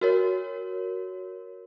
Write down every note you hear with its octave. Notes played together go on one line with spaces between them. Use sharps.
F#4 A#4 C#5